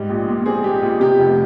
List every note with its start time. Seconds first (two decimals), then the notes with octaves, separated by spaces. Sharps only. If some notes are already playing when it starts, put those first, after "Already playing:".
Already playing: G#2 G3
0.10 A#1
0.28 A#2
0.46 C4 G#4
0.64 G3 G4
0.82 A#1
1.00 C3 G4
1.19 F1